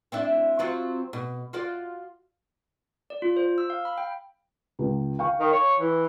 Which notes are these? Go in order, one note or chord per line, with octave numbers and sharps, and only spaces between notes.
C4 D4 E4
F#3 C4 F4
B2
F4 F#4 D5
D5
F4
C5
E6
F5
B5
G5
C#2
F5 G5 C#6
D#3
C#5
E3